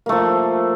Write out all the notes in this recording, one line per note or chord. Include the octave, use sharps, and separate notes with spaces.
F3 A3 A#3